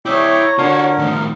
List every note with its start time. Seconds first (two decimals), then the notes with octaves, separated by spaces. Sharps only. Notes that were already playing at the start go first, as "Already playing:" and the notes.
0.06 E4 C#5 D5 E5 G5 D6
0.41 A#5
0.59 D3 F4 F#4 A#4
0.98 A2 D#3